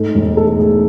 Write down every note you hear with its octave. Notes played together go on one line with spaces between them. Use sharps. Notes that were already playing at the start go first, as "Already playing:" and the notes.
Already playing: G#2 A3
E1
A3 A4
A3 G#4